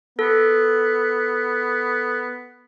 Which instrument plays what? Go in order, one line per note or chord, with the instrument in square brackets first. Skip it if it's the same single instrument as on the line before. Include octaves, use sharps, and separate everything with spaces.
[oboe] B3 [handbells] A4